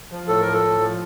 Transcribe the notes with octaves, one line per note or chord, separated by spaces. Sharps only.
F3
A2 A4
F3 A#4
A4
A2
F3